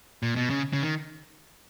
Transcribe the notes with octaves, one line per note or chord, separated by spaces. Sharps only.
A#2
B2
C#3
C#3
D#3